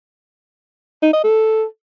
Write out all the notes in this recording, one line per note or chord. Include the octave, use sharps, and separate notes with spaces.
D#4
D#5
A4